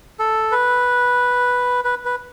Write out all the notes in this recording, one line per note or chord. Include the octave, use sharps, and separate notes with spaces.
A4
B4
B4
B4